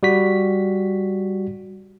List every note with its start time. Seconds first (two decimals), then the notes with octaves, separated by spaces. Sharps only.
0.03 G3 F#4 B6